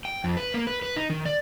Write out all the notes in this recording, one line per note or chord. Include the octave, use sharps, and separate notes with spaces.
G5
F2
B4
A#3
B4
B4
D#4
D#3
D5